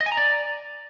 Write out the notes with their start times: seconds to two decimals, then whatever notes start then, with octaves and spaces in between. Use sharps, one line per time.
0.01 D#5
0.06 G#5
0.12 A#5
0.17 D5